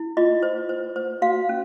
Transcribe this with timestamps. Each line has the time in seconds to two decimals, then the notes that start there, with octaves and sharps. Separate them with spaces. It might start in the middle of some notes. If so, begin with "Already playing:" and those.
Already playing: E4
0.17 F4 D#5
0.43 C5
0.69 C5
0.96 C5
1.22 F#4 F5
1.49 C#4